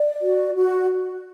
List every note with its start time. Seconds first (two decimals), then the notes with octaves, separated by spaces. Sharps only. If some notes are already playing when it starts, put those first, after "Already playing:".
Already playing: D5
0.21 F#4
0.54 F#4